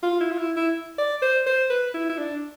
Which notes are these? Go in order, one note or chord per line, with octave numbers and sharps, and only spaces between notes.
F4
E4
F4
E4
E4
D5
C5
C5
B4
E4
E4
D4